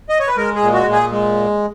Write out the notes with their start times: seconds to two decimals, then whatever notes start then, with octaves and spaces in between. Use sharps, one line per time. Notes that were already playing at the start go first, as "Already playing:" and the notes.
0.09 D#5
0.19 C#5
0.27 B4
0.37 G#3 A#4
0.55 G#4
0.62 A#2
0.73 F#4
0.86 A#2
0.92 G#4
1.11 G#3